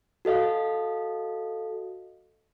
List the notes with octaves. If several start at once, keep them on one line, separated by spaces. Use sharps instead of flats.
F#4 A4 D#5 F5